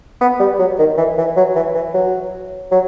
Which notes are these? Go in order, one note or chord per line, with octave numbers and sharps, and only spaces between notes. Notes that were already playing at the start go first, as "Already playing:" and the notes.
B3
G3
F#3
D#3
E3
E3
F#3
E3
E3
F#3
F#3